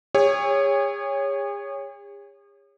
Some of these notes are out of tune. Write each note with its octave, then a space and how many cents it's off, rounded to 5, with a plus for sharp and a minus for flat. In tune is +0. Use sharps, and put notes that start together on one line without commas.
G#4 -45 C#5 +0 E6 +0